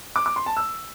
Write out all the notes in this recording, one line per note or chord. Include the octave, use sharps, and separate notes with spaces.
D6
D6
C6
A5
E6